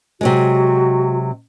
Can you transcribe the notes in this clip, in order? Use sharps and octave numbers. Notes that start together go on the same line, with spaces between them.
C3 F#3 G#3 F#4